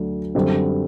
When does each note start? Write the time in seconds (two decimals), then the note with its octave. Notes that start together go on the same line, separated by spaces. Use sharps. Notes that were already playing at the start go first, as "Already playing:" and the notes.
Already playing: D2 D3 F#3
0.35 F#2 D3 G3 C4